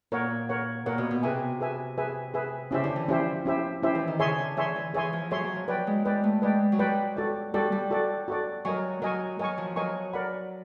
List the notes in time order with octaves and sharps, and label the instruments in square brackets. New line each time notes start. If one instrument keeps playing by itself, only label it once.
[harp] A#2 [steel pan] A#4 C#5 F#5
[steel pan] A#4 C#5 F#5
[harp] A#2 [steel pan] A#4 C#5 F#5
[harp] B2
B2
[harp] C3 [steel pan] G#4 B4 E5 G#5
[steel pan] G#4 B4 E5 G#5
G#4 B4 E5 G#5
G#4 B4 E5 G#5
[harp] C#3 [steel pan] C#4 E4 G4 C5 E5
[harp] D3
E3
[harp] F3 [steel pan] C#4 E4 G4 C5 E5
[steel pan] C#4 E4 G4 C5 E5
C#4 E4 G4 C5 E5
[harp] E3
D#3
[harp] C#3 [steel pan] G#4 C#5 E5 G#5 C6
[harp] D3
[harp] E3 [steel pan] G#4 C#5 E5 G#5 C6
[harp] E3
[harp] E3 [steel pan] G#4 C#5 E5 G#5 C6
[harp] F3
[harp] F#3 [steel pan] G#4 C#5 E5 G#5 C6
[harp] F#3
F3
[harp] F#3 [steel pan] B4 D5 G5
[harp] G#3
[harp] G#3 [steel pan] B4 D5 G5
[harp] A3
[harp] G#3 [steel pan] B4 D5 G5
[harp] F#3
[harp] G3 [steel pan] B4 D5 G5
[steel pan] F#4 A4 D5
[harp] G3 [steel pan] F#4 A4 D5
[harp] G3
[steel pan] F#4 A4 D5
F#4 A4 D5
[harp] F#3 [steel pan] A#4 D#5 G#5 C#6
[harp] F#3 [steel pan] A#4 D#5 G#5 C#6
[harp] F#3 [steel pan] A#4 D#5 G#5 C#6
[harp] F3
[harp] F#3 [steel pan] A#4 D#5 G#5 C#6
[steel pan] A#4 D5 F#5 B5